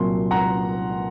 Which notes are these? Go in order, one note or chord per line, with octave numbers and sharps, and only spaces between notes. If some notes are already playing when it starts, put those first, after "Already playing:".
Already playing: C2 A#2 F#3 C6
F#5 A#5